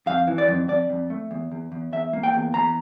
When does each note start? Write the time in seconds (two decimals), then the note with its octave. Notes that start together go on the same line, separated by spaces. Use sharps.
0.06 F2 F5
0.28 E3
0.38 D5
0.48 F2
0.68 F2 D5
0.90 F2
1.10 A3
1.31 E2
1.52 E2
1.72 E2
1.92 E2 E5
2.13 A#3
2.23 G5
2.34 E2
2.54 E2 A#5